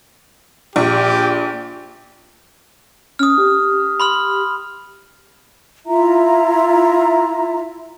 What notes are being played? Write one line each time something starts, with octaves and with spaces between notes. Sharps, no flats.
A#1 G4
C#4 D#6 F6
G4
B5 C6 F6
E4 F4 E5 A#5